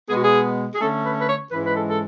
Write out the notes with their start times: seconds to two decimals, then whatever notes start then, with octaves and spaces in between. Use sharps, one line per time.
0.09 B2 G#3 B3 G#4
0.15 F#4
0.23 G#4
0.74 G#4
0.80 D3 A3 C#4 A4
1.04 B4
1.19 B4
1.28 C#5
1.51 G#2 E3 G#3 C#4 B4
1.64 B4
1.74 A4
1.88 A4